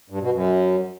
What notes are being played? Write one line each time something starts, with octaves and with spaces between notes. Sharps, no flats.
G2
B2
F#2